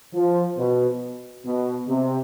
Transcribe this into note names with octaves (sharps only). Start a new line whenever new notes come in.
F3
B2
B2
C3